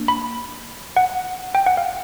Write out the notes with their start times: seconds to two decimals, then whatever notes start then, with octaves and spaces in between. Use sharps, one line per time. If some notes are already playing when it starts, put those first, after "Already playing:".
Already playing: A#3 D4
0.08 B5
0.97 F#5
1.55 G5
1.66 F#5
1.77 F5